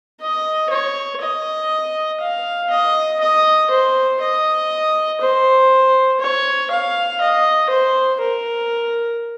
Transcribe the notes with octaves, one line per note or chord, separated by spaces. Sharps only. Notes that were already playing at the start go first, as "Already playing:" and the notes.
D#5
C#5
D#5
F5
D#5
D#5
C5
D#5
C5
C#5
F5
D#5
C5
A#4